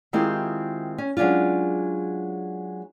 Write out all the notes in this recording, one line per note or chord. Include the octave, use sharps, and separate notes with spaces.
D#3 G#3 C4 E4 F4 G4
C#4
F#3 G#3 C#4 D4 F4